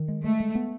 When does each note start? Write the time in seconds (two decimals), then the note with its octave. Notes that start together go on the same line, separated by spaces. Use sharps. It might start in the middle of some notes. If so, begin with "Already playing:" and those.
Already playing: D#3
0.08 G#3
0.24 G#3 A3
0.40 G#3
0.55 B3